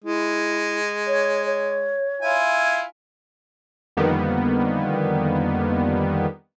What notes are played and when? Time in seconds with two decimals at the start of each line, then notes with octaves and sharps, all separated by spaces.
0.04 G#3 E4
1.07 C#5
1.45 C#5
2.22 E4 F4 G#5
3.97 F2 D3 D#3 G3 A#3 B3